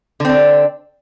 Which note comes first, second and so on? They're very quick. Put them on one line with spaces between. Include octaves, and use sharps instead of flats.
D3 C4 D4